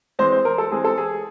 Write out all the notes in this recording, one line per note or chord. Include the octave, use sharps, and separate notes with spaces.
E3 G#3 C4 C5
C5
A#4
A4
E3 G#3 C4 G#4
A4
G#4